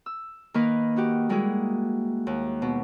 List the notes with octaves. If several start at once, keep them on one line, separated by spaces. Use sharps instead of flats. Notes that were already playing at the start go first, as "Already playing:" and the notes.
E6
D#3 A#3 D#4 A#4 B4
D#4 F#4 G4
G3 G#3 A#3 E4 F#4 G#4
D#2
B2